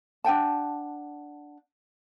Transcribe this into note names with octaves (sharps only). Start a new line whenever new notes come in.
D4 F#5 G5 A5